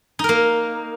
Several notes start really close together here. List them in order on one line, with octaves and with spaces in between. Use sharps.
D#4 A#4 A#3